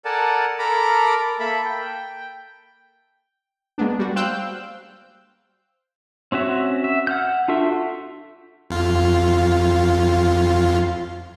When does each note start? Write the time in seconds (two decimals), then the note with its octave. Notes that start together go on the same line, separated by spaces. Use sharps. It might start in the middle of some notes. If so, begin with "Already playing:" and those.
0.05 A4 A#4 D5 F#5 G#5 A5
0.59 A4 A#4 A#5 B5 D6
1.40 A#3 A4 E5 B5
1.65 G5
3.78 G#3 A#3 B3 D4
3.99 G3 F#4
4.16 C5 F5 G5 E6 F#6 G6
6.32 C4 C#4 F#4 E5
6.84 E5
7.07 F#5 F6 G6
7.48 D4 F4 F#4 A4 E5
8.70 F2 F4